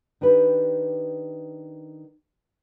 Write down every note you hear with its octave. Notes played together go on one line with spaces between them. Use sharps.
D#3 D4 G4 B4